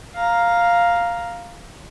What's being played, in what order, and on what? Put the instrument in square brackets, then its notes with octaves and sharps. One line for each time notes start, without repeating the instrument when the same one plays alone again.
[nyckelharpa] F5 A#5